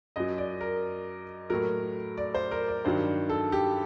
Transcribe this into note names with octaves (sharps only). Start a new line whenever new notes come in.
F#2 F#3 D#5
D5
A#4
A2 F#3 A#4
D5
C5
A#4
D5
G2 D#3 F#3 C5
A4
G4